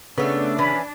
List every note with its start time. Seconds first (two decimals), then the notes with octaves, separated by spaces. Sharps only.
0.18 C#3 A3 B3 D4
0.58 E3 C#4 B5